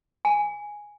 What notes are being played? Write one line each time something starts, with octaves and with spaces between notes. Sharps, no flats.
G#5